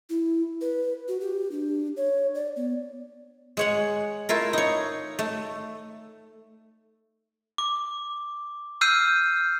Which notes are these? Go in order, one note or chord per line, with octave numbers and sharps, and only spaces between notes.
E4
B4
F#4
G4
D4
C#5
D5
B3
G#3 C#5 F#5
A3 E4 F4 A#4
D#4 C#5
A3
D6
E6 F6 G6 C7 D#7